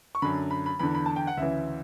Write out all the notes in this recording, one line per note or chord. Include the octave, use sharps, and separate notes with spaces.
C#6
F#2 D3 B5
B5
B5
E2 D3 B5
B5
A5
G5
F#5
D2 C#3 E3 E5